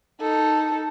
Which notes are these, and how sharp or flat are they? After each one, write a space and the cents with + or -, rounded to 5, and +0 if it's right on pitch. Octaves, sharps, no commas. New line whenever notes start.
D#4 +0 A4 +0